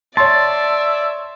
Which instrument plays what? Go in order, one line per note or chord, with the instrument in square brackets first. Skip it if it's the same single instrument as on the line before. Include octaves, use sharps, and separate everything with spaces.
[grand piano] C#5 C6 [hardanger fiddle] D5 [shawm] E5 [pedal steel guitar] A5